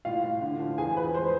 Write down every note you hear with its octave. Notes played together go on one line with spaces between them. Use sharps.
A2 F4 F5
A2
D3
F3
E2 G#4 G#5
F3 B4 B5
G#3 C5 C6